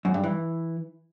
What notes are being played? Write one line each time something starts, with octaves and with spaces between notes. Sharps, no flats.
F#2
G2
E3